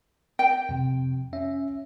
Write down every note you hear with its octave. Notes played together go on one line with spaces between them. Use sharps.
G5
F2 C3
C#4 E5